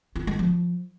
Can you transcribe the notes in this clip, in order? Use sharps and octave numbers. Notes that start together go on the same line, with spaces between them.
F4
G#3
F3